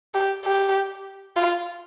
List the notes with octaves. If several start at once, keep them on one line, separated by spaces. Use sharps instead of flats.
G4
G4
F4